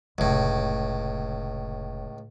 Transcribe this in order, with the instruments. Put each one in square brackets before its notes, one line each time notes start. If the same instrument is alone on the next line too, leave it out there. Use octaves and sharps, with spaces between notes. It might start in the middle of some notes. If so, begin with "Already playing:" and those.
[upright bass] F1 C3 [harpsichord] C#2 A2